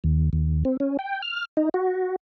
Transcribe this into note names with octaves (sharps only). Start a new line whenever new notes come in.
D#2
D#2
C4
C#4
G5
F6
D#4
F#4